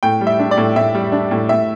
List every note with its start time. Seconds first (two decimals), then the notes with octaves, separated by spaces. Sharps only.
0.03 A2 G5
0.21 G3
0.27 E5
0.39 D4
0.51 D5
0.57 A2
0.76 A2 E5
0.95 G3
1.12 D4
1.31 A2
1.49 A2 E5